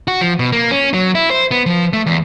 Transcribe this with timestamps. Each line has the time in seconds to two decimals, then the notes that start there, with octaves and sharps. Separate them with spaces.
0.08 F#4
0.21 F3
0.39 B2
0.52 A#3
0.71 C#4
0.94 F#3
1.15 E4
1.31 C5
1.51 B3
1.66 F3
1.93 A3
2.06 E2